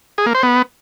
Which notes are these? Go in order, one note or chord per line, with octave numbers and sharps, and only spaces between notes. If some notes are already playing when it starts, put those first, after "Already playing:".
G#4
A#3
C5
B3